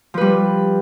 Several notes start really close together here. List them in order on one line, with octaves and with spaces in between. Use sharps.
F3 B4 G3